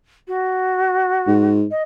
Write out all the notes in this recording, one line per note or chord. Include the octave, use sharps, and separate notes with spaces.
F#4
G#2
D#5